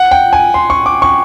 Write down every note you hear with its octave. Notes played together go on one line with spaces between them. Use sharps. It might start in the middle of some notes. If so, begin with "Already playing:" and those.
Already playing: F#5
G5
G#5
C6
C#6
D6
C#6